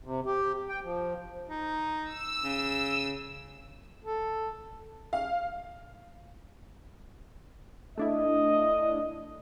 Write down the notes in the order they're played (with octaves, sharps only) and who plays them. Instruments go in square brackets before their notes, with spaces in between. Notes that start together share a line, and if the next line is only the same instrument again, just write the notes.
[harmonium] C3
G4
G5
F3
[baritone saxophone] D#4
[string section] E6
[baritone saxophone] C#3
[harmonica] A4
[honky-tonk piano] F5
[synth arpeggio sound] A3 D4 E4 [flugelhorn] D#5